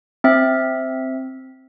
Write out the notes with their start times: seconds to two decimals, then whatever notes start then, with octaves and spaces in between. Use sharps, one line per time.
0.24 C4 E5